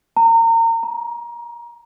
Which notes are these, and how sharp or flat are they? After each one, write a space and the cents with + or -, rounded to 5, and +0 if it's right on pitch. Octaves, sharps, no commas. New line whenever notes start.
A#5 -30
A#5 +25